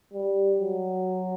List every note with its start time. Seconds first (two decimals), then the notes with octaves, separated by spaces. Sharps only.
0.13 G3
0.59 F#3